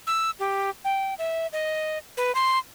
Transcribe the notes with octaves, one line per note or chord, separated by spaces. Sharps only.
E6
G4
G5
E5
D#5
B4
C6